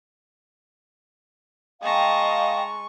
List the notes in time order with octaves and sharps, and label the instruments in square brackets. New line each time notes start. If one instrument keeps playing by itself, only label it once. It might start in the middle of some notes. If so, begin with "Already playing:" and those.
[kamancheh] G#3 C#6 [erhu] D#5 [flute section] F5 G5 [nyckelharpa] A5 A#5